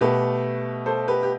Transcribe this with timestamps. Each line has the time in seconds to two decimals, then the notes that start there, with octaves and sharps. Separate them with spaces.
0.01 B2 A3 G4 B4
0.86 A4 C5
1.08 G4 B4
1.23 G4